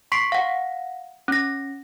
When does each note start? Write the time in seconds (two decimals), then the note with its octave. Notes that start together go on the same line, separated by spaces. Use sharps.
0.12 C6 C#6 B6 C7 D7
0.32 F5 F#5
1.28 C#4 A#6